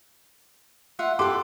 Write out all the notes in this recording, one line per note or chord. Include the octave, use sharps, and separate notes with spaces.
F4 E5 F#5
G4 A4 B4 C6 D6